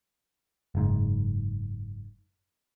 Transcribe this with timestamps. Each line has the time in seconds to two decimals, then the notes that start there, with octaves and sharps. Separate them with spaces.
0.75 F#1 G#2